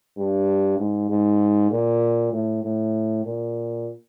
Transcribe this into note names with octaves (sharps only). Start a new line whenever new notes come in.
G2
G#2
G#2
A#2
A2
A2
A#2